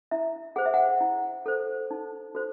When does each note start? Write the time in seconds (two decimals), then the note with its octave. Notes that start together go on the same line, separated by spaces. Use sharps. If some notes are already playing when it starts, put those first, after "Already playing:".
0.11 E4 E5
0.56 G#4 C5 F#5
0.66 E5
0.74 F#5
1.01 E4
1.46 A4 C5
1.91 D#4
2.35 F#4 A4 C5